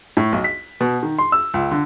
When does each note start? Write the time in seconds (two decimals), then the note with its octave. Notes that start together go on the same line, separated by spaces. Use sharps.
0.17 A2
0.32 B1
0.44 B6
0.81 B2
1.03 D#3
1.19 C6
1.32 E6
1.54 C#2
1.71 D3